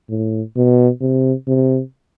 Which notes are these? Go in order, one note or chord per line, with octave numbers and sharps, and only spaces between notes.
A2
B2
C3
C3